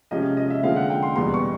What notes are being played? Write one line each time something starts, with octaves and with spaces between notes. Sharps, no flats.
C3 F3 G#3 C#4 D#5
D#5
E5
D3 F3 G#3 C4 F5
F#5
G5
C6
E2 B2 G3 B3 C6
C#6